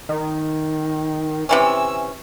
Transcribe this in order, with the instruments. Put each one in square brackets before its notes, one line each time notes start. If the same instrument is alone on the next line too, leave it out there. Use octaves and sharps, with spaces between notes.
[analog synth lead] D#3
[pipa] C3 E3 C#4 [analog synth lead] E6